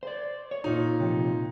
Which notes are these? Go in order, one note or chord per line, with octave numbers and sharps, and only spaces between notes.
C5 D5
C#5
A#2 D#4
C3 F3